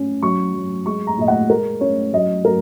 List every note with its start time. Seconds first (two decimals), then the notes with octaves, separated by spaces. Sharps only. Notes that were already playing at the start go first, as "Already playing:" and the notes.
Already playing: C#4
0.22 F#3 C#6
0.54 F#3
0.86 G#3 C#6
1.07 A#5
1.18 A#2 D#5
1.28 F#5
1.50 G#3 A#4
1.81 C#4 C#5
2.13 F#3 D#5
2.45 F#3 A#4